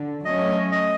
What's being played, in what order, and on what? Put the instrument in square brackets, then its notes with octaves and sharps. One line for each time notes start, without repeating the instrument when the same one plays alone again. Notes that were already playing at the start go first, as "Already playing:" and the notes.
Already playing: [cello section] D3
[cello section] F#3 A3 C#4 [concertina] D#5
[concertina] D#5